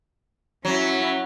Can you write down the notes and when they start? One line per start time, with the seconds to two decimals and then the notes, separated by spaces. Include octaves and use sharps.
0.65 F#3 C#4 E4